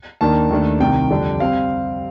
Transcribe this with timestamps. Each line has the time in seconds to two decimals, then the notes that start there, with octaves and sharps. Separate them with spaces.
0.21 D#2 D#3 A#3 D4 A5
0.50 D#2 D#3 A3 D4
0.80 C2 C3 D#3 G5
1.10 F2 D3 G3 D4
1.40 C3 G3 C4 F5